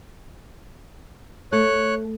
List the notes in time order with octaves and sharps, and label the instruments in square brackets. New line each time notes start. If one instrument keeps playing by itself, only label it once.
[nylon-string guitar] A3 [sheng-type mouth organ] C#5 F#6